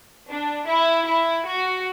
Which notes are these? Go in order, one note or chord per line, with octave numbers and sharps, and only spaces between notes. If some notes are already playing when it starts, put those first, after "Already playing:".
D4
E4
E4
F#4